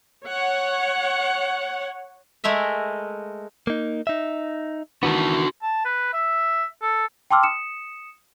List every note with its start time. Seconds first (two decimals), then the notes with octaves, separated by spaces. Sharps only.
0.24 C#5 F#5
2.44 G#3 A3 A#4 E5
3.67 A#3 D#4
4.07 D#4 E5
5.03 D#3 E3 B3 D4 F#4 A5
5.62 A5
5.85 B4
6.13 E5
6.82 A4
7.31 G5 A5 C6 D6 E6 F6
7.43 D#6 C#7 E7